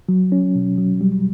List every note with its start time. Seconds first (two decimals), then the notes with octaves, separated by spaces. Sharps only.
0.09 F#3
0.32 C#4
0.55 B2
0.78 F#3
1.01 G3